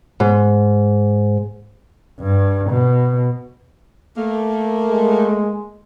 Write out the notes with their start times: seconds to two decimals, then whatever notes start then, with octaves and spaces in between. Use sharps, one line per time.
0.20 G#2
2.19 G2
2.70 B2
4.16 A3 A#3
4.90 G#3